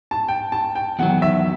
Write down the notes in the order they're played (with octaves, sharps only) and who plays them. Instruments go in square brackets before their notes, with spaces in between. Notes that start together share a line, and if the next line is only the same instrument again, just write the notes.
[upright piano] A5
G5
A5
G5
[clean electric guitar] E2 C3 D#3 F#3 [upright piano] F#5
[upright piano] E5